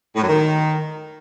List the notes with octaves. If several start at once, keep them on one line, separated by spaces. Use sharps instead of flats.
A2
F#2
D#3